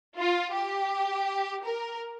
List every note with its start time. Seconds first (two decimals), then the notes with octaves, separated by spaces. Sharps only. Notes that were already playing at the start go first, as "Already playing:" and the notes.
0.17 F4
0.54 G4
1.64 A#4